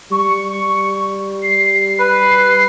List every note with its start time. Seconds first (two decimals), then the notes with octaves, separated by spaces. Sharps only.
0.12 G3 C#6
1.42 C7
1.99 B4